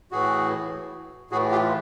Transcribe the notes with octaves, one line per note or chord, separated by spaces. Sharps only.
A2 E3 F#4 G#4
A2 E3 F#4 G#4
F4 G4